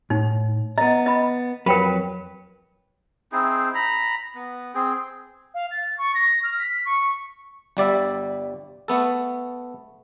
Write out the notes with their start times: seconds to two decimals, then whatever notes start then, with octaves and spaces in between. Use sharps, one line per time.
0.10 A2 D#4
0.78 B3 D#5 A#5
1.06 D#5 B5
1.66 F2 F#3 A#4 B4 G5 B5
3.32 C4 D#4 E4 G#4
3.75 A#5 B5
4.35 B3
4.74 C4 G#4
5.54 F5
5.71 A6
5.98 C#6
6.14 A#6
6.43 F6
6.59 B6
6.85 C#6
7.77 G1 G3 D5 E5
8.88 A3 B3 A4